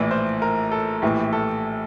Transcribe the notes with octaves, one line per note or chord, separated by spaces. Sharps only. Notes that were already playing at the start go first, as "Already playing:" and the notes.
Already playing: A#1 A2 E3 D5
C5
A#4
A4
A#1 A2 E3 G4
A4